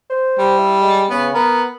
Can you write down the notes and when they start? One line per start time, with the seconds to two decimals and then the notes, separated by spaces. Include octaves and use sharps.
0.10 C5
0.39 G3
0.59 E4
0.81 G#3
1.10 C#3 B3
1.34 B3 A#4